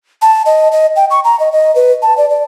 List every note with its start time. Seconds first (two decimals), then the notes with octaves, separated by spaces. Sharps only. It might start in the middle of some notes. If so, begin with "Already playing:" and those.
0.22 A5
0.46 D#5
0.72 D#5
0.96 G5
1.11 C#6
1.24 A#5
1.40 D#5
1.52 D#5
1.75 B4
2.02 A5
2.18 D5
2.30 D5